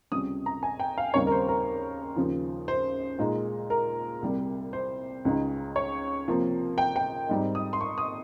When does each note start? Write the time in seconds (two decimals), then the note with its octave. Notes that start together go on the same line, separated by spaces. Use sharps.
0.12 C#2 C3 G3 C#4 D#6
0.46 A#5
0.63 G#5
0.80 G5
0.98 F5
1.14 D#2 C#3 G3 C4 D#4 C#5
1.27 A#4
1.32 C5
1.48 A#4
2.16 D#2 C#3 F3
2.68 C5
3.19 A#2 G#3 D#4
3.70 A#4
4.22 C2 C3 G3
4.73 C5
5.25 C#2 C#3 G#3 D#4
5.76 C#5
6.28 C3 F3 A#3
6.78 G5
6.96 G5
7.29 G#2 G3 C4 D#4
7.55 D#6
7.73 C6
7.81 C#6
7.98 D#6